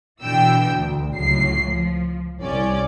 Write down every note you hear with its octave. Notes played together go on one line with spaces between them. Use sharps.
B2 D3 E3 G5 E6
D2
C#2 A2 F#3 C7
F3
C2 C#4 D5